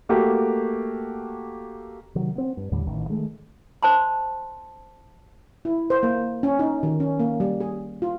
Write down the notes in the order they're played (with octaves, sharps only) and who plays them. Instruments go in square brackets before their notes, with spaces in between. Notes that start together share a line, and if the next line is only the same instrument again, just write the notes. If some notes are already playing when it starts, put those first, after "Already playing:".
[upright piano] A3 A#3 F#4 G4 A4
[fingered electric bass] C3 D#3 F#3
B3 C4
G2
D#2 A2 D3 G3
A1 D#3
D#3 G#3 A3
[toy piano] C5 A5 C6
[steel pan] E4
C5
A#3
C#4
D#4
D#3
C#4
A#3
G3
G#4
F4